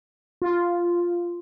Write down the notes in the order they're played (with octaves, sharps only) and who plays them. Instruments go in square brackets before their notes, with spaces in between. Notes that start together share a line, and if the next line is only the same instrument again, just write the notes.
[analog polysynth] F4